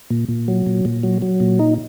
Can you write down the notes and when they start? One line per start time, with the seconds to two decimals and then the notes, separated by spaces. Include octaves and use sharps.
0.10 A#2
0.29 A#2
0.48 F#3
0.66 A#2
0.85 A#2
1.03 F#3
1.22 F#3
1.40 A#2
1.59 D#4